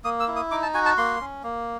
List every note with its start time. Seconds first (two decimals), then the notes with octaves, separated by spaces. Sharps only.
0.04 A#3 D#6
0.20 E6
0.28 E4
0.36 D#6
0.51 D#4 D6
0.63 A5
0.74 F#4 G#5
0.85 A5
0.98 A#3 C6
1.21 C#4
1.43 A#3